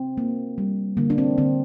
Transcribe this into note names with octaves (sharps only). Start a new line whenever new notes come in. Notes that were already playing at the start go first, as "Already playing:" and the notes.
Already playing: C4
A#3
G3
D3 A#3
D4
C4
D3 C4